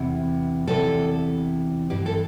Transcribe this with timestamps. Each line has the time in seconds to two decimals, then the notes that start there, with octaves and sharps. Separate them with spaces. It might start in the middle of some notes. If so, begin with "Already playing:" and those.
Already playing: E2 C3 E3
0.68 E2 C3 E3 A4
1.90 G2 E3 G4
2.06 A4